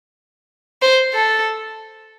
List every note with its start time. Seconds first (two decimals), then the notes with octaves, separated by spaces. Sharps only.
0.82 C5
1.14 A4